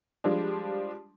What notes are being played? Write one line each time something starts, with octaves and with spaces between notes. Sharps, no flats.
F3 G3 G#3 D4